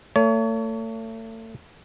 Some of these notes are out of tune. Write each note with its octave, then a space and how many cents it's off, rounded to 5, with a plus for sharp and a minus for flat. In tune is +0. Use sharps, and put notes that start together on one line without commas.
A3 +35 C#5 +35